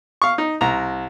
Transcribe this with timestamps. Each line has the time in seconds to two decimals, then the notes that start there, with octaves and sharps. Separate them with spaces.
0.22 F5 C#6
0.38 D#4
0.61 C2 A#5